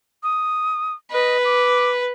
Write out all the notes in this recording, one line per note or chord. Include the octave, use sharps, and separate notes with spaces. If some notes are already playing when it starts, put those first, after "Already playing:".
D#6
B4 D#5
D6